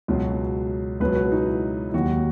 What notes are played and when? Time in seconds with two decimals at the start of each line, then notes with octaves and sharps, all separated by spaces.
0.08 C#2 B2 F#3
1.00 C#2 B2 F#3 B4
1.16 B4
1.32 D#4
1.47 E4
1.89 E4
1.94 D#2 D#3 F#3 F#4